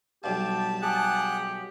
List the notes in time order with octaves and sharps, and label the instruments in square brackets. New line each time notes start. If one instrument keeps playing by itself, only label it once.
[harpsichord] B1 G2 [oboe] G4 [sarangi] A5
[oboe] G4 [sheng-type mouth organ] G#4 F#5 F#6